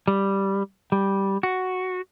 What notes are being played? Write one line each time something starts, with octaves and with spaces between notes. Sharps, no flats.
G3
G3
F#4